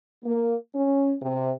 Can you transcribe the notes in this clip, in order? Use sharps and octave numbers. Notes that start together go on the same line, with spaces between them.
A#3
C#4
C3